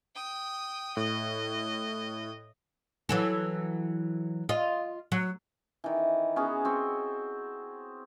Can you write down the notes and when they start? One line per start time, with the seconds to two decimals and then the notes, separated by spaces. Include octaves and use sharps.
0.15 G5 D#6
0.97 A2 D#5
3.09 E3 F#3 A4
4.49 F4 D#5
5.12 F#3
5.84 D#3 E3
6.36 B3 C#4 F#4 G#4
6.65 C4 F#4